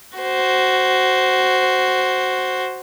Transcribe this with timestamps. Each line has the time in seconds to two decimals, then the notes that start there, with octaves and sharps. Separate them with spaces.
0.18 F#4 C5